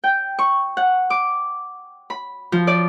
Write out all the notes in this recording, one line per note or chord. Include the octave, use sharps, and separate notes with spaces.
G5
C#6
F#5
D6
B5
F3
D5